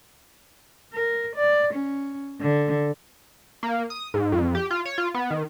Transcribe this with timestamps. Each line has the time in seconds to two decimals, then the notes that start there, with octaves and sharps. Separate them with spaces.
0.93 A#4
1.36 D5
1.73 C#4
2.40 D3
3.63 A#3
3.90 D#6
4.14 G#2
4.32 F2
4.55 G4
4.71 F4
4.85 C#5
4.98 F4
5.14 B3
5.31 D#3